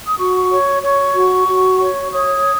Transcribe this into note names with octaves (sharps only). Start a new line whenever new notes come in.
D#6
F#4 C#6
C#5
C#5 C#6
F#4
F#4
C#5
C#5 D#6